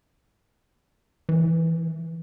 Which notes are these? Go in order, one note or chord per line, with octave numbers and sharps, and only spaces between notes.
E3